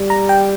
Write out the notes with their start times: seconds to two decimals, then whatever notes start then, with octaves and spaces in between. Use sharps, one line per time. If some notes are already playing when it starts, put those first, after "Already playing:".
Already playing: G3
0.10 A#5
0.29 G5